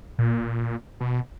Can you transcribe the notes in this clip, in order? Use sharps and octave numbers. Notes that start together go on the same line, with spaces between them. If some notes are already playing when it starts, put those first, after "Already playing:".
A#2
B2